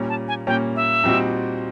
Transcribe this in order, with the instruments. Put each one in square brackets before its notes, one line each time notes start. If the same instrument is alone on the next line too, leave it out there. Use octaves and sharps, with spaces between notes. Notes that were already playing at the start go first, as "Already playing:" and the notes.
Already playing: [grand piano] A#2 G3 A#3 C#4
[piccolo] A5
G#5
[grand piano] A#2 G3 A#3 C#4 [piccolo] G5
[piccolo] E5
[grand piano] A#2 G3 C4 D#4 F#4